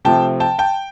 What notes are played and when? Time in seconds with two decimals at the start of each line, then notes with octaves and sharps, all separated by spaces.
0.05 C3 F3 A3 C4 G5 A5
0.40 G5 A5
0.58 G5 A5